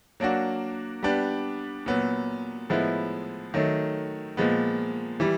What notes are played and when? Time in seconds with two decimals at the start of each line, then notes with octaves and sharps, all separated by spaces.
0.20 F#3 A#3 D4 F#4
1.03 G3 B3 D4 G4
1.86 A#2 F#3 B3
2.70 A2 F3 G#3 B3 E4
3.54 D#3 F#3 A3
4.37 A#2 F3 G#3 B3
5.20 E3 G3